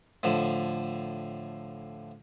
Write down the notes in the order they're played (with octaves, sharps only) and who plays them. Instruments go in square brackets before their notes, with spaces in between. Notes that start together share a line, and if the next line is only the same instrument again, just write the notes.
[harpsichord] A2 D3 F3